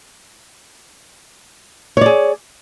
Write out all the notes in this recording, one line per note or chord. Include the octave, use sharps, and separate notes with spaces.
G#4 C#5 D5